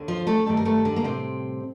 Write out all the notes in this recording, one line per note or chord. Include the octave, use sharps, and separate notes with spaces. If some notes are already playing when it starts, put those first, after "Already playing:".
Already playing: D#2 D3
F3 F4
A3 A4
G2 D#3 G3 A3 A4
A#4
A3 A4
D3 D4
A#3
A2 C3 G3 C4